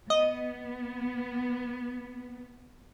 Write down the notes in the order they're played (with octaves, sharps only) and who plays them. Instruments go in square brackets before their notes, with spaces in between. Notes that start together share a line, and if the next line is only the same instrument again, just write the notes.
[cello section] B3 [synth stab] D#5